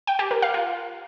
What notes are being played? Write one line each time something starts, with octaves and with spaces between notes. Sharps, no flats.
G5
G4
A#4
F5
F4